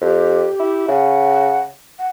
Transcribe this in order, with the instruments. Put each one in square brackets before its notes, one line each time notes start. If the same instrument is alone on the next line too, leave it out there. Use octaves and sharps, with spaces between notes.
[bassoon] F2 [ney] G4
[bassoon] E4
[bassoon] C#3 [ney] F#5
[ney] F#5